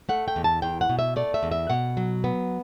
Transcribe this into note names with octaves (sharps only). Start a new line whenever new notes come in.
A3 F#5
G5
E2
A5
E2 G5
F#5
B2
E5
A3 D5
E5
E2
E5
B2 F#5
F#3
B3